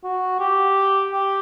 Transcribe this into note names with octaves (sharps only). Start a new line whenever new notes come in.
F#4
G4
G4